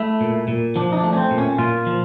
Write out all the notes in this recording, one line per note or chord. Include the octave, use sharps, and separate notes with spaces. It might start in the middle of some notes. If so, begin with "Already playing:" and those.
Already playing: A3 E4
A#2
A#2
F3 D4
D#4
D4
A3
C#4
C4
A#2
C#4
A#2 F4
F3